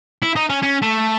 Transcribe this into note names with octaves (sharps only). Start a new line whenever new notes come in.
E4
D#4
C#4
C#4
A3